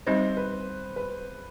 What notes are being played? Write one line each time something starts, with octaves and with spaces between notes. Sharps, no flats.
G3 C4 D#4 G4 C5 D#5
B4
B4